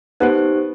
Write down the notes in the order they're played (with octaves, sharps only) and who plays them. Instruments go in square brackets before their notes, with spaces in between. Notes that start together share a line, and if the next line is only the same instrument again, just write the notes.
[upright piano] B3 B4 [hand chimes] D#4 G4 C5